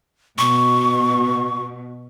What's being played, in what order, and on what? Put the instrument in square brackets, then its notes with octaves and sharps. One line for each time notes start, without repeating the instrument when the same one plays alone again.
[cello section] B2 [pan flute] C#6